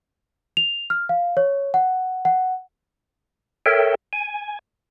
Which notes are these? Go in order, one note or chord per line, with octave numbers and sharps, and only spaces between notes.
F7
F6
F5
C#5
F#5
F#5
A4 A#4 C#5 E5 G5
G#5